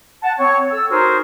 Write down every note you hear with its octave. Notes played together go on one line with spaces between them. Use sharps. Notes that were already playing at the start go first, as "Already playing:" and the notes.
F#5 A5
C4 C#5
A4 E6
D#4 F#4 G#4 A#4 C5